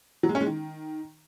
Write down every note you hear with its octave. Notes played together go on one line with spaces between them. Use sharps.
F#3
G#3
C#4
G#3
D#3